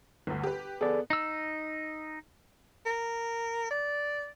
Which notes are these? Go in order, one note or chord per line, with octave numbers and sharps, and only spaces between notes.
G1 D2
G4 B4
B3 G#4 A4 D5
D#4 E6
A#4
D5